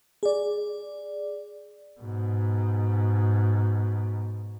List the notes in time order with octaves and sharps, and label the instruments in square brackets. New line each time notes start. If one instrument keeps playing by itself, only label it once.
[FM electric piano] G#4 D5
[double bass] G#2 B2